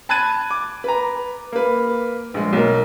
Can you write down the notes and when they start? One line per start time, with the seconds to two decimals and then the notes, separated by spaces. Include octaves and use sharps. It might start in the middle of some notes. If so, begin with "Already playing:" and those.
0.09 A5 B5 F#6 G#6 A6 D#7
0.51 D6
0.84 B4 A#5
1.52 A#3 B4
2.34 A#1 G#3
2.53 B1 A#4